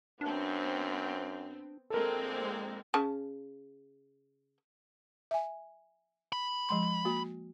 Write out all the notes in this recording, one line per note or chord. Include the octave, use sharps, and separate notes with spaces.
F#2 B3 C4 D4
A#1 G#3 A#3 C4 A4 A#4
C#3 A5
E5 G#5
B5
F3 G#3 C6
A#3 F#4